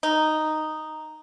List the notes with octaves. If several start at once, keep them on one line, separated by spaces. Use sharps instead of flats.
D#4